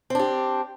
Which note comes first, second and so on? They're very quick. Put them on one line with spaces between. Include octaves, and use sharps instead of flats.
C4 D4 G4